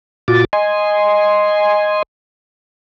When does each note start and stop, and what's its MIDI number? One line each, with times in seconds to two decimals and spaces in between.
0.28 0.45 46
0.28 0.45 65
0.28 0.45 66
0.28 0.45 86
0.28 0.45 93
0.53 2.03 75
0.53 2.03 80
0.53 2.03 84